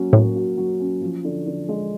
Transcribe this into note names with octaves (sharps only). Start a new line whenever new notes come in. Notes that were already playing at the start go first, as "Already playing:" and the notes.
Already playing: F#3 A#3 C#4 F#4
A2 A#3
F#4
F#3
C#4
F3
D3
D3
G#3